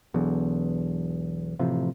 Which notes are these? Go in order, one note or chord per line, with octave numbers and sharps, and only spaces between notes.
E1 B1 E2
A1 C3 F3